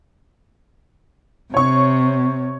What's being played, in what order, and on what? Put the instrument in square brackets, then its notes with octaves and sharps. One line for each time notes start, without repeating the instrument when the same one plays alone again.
[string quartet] C3 [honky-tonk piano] C#5 C#6